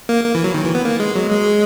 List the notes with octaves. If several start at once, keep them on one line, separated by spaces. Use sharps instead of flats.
A#3
A#3
E3
F#3
D#3
E3
B3
A#3
G#3
F#3
G#3